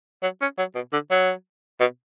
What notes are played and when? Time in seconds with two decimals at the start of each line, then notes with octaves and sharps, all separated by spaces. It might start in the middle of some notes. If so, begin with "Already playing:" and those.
0.23 F#3
0.41 C#4
0.58 F#3
0.75 B2
0.93 D3
1.10 F#3
1.80 B2